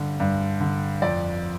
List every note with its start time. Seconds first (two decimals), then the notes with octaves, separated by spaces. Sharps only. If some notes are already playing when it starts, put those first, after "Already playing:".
Already playing: G2 D3
0.20 G2
0.60 D3
1.02 F2 D5